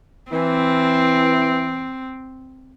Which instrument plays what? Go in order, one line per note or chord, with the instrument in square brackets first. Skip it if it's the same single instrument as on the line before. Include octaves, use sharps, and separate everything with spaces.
[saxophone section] E3 [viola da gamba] C4